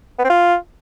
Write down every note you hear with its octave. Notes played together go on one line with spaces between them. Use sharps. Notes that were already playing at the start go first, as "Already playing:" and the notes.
B3
C4
F4